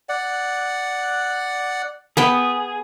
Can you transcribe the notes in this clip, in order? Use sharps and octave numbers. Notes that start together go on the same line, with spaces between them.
D5 F#5
B3 G#4 B4 G5